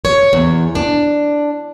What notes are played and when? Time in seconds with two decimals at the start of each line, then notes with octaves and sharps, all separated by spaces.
0.05 C#5
0.33 E2
0.75 D4